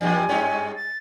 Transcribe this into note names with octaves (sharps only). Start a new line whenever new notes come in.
E2 G2 A#2 G#5
G2 G#3 C#4
A6